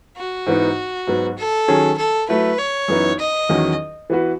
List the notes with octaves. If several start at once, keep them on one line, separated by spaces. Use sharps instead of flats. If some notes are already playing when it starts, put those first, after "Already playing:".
F#4
G#2 E3 B3 D#4
G#2 F#3 B3
A4
D#3 F#3 C#4 G#4
A4
F#3 A3 E4 B4
C#5
F#2 E3 B3 D#4
D#5
E2 D#3 F#3 C#4
E3 B3 F#4 B4